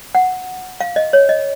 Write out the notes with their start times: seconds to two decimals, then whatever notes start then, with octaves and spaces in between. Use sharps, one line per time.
0.15 F#5
0.80 F5
0.96 D#5
1.13 C#5
1.29 D#5